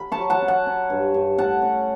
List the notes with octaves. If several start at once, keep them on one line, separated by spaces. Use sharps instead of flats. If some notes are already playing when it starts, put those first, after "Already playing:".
Already playing: B5
A5 C#6
F#3
F#5 A5
C#4
F#5 A5
C#4
G2
G2
A2 F#5 A5
C#4